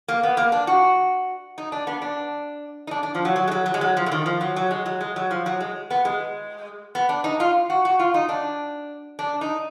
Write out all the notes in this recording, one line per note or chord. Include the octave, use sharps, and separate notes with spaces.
A#3
B3
A#3
D4
F#4
D#4
D4
B3
D4
D#4
D4
D4
F3
F#3
F#3
G#3
F#3
F#3
G#3
F#3
F3
D3
D#3
F3
F#3
F#3
G#3
F#3
G#3
F#3
F3
F#3
G#3
B3
G#3
B3
D4
D#4
F4
F#4
F#4
F4
D#4
D4
D4
D#4